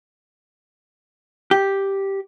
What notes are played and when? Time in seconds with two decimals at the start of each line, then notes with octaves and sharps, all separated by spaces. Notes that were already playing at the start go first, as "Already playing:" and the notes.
1.51 G4